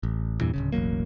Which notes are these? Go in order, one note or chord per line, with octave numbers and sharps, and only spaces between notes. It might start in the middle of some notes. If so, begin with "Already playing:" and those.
A1
E2 G2 A#2 E3
D1 B1 C#3
E1 A1 F#3 A#3